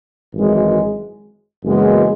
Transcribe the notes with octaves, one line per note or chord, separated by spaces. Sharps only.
G#1 F#2 E3 G#3
F#1 F#2 E3 G#3 B3